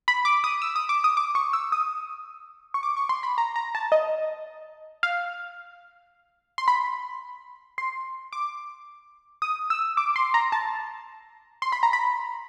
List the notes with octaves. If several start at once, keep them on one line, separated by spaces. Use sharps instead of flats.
B5
D6
D#6
E6
D#6
D6
D#6
D6
C#6
E6
D#6
C#6
D6
C#6
C6
B5
A#5
A#5
A5
D#5
F5
C6
B5
C6
D6
D#6
E6
D6
C6
A#5
A5
C6
B5
A#5
B5